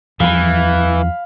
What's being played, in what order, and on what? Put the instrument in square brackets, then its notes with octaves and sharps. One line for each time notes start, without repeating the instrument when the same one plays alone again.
[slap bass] E2 F3 G3 [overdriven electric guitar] E3 [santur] F5 B5